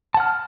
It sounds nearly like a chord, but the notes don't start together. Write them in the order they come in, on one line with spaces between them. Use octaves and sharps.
A5 F#5 F6